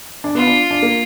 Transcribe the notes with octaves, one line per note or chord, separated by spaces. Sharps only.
D4
B3 F4
D4
D4
A#3